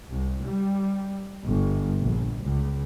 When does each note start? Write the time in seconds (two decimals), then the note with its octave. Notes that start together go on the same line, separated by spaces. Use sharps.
0.11 C2
0.44 G3
1.42 G1
2.00 A#1
2.43 C#2